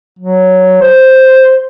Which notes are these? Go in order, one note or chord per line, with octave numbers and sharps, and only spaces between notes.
F#3
C5